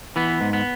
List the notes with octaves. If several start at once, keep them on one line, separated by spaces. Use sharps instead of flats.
E3 B3
G#2
B3